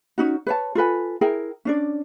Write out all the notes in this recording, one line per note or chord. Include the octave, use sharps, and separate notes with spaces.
C#4 D#4 F#4
B4 C#5 A5
F4 A4 B4 G#5
E4 G#4 A#4 G5
C#4 D4 D5